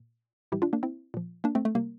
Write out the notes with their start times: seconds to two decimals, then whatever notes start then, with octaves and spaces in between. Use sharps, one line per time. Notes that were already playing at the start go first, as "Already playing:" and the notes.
Already playing: A#2
0.52 A2 E3 G3 E4 G4
0.62 D4 F4
0.73 A#3 D4
0.83 C4 E4
1.14 A#2 F3
1.44 A#3 D4
1.55 A3 C4
1.65 A3
1.75 C3 G3 A#3